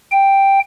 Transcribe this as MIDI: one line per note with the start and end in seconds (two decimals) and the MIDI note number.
0.11 0.59 79